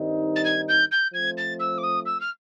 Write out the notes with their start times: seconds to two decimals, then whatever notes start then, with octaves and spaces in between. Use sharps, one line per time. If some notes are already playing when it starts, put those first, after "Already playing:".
Already playing: G2 D#3 G3 C4 D#4
0.35 A6
0.44 G#6
0.68 G6
0.91 G6
1.13 F3 A3 C4 G#6
1.37 A6
1.59 E6
1.78 D6
1.83 D#6
2.05 E6
2.20 F6